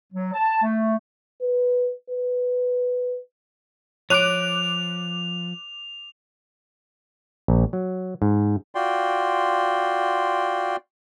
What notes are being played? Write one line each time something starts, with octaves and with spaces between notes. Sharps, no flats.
F#3
A5
A3
B4
B4
F3 C#5 D6 F#6 D7 D#7 F7
A#1
F#3
G#2
F4 F#4 D5 G5 C6